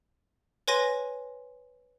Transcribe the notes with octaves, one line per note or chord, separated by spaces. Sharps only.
B4 C#5 G#5 C6 A#6 D#7